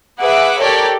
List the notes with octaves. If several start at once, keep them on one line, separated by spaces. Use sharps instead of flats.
G#4 B4 E5 F#5 D6
G4 A4 A#4 C#5 D5 G5